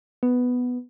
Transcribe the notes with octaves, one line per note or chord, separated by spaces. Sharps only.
B3